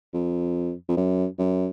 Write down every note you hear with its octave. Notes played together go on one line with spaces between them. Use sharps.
F2
F2
F#2
F#2